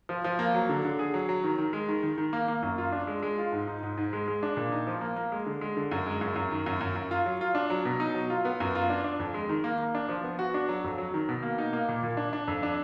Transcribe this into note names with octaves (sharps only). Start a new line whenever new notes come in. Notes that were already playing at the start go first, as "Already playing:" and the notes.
F3
F3
A#3
F#3
D3
D3
G#4
F#3
F#3
D#3
D#3
G#3
D#3
D#3
D#3
A#3
A#3
F#2
F4
D4
G#3
G#3
F4
G#2
D#4
G#2
G#2
G#3
G#3
D4
A#2
D#4
F3
A#3
A#3
G#3
D3
G#3
D3
F#2
G#3
F#2
F#2
D#3
F#2
F#2
F#2
F4
F#3
F4
D4
F#3
B2
D#4
F#3
F4
B3
F#2
F4
D4
D4
F2
G#3
D#3
A#3
A#3
D4
F3
B3
F#4
D4
F#3
F2
F#3
D#3
B2
A#3
D#4
A#3
A#2
A#2
D4
D4
F2
D4